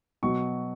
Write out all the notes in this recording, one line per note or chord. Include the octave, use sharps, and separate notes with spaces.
B2 F#3 C#6